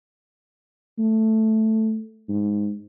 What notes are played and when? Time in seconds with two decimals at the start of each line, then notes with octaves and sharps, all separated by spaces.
0.99 A3
2.29 G#2